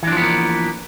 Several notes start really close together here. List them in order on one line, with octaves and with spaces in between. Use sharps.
E3 D4 F3 B3 A#3